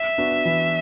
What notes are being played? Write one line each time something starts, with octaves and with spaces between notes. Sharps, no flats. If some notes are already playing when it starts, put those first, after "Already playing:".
Already playing: E5
B3 D4 F#4
E3